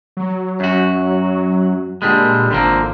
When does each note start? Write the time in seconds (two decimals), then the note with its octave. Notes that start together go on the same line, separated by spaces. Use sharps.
0.17 F#3
0.60 F#2 F#4
2.02 A#2 D3 G3 G#3
2.51 G#1 D3 F3 A#3